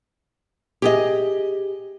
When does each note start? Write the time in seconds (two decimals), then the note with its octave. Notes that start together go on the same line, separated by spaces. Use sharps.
0.82 G4 G#4 D#5